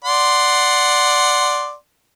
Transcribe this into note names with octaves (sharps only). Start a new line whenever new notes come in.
D5 F#5 C6